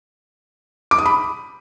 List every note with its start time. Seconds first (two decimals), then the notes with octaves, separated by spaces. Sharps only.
0.91 D6
0.98 D#6
1.06 B5